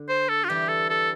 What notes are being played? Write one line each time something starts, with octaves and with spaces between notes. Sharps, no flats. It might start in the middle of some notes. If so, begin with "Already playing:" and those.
Already playing: D3
C5
A4
F4
E3 G3 G4
A4
A4